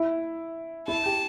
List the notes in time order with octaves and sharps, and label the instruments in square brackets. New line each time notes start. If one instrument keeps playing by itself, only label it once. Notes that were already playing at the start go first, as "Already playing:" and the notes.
Already playing: [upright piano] E4
[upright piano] E4 [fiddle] A5
[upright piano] G4